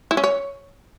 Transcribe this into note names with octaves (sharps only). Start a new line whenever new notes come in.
E4
C#4
C#5